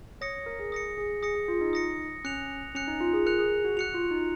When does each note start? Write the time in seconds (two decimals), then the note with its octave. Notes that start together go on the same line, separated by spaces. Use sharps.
0.21 C#5 D#6 A#6 C#7
0.46 A#4
0.59 G#4
0.72 D#6 A#6 C#7
0.98 G#4
1.23 G#4 D#6 A#6 C#7
1.35 G#4
1.48 F4
1.61 D#4
1.73 D#6 A#6 C#7
2.24 C#4 F#6 C#7 F7
2.75 C#4 F#6 C#7 F7
2.87 D#4
3.01 F4
3.13 G#4
3.26 A#4 F#6 C#7 F7
3.39 G#4
3.64 F#4
3.77 F#4 F#6 C#7 F7
3.94 F4
4.11 D#4